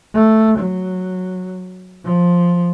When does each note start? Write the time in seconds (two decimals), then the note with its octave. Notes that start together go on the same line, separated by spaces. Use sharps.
0.14 A3
0.59 F#3
2.05 F3